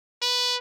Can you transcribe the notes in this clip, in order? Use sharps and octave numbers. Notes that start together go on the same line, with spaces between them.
B4